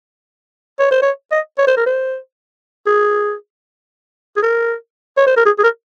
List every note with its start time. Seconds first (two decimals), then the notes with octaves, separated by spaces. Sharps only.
0.79 C#5
0.91 C5
1.02 C#5
1.32 D#5
1.58 C#5
1.67 C5
1.77 A#4
1.86 C5
2.86 G#4
4.36 G#4
4.42 A#4
5.17 C#5
5.27 C5
5.36 A#4
5.46 G#4
5.59 G#4
5.64 A#4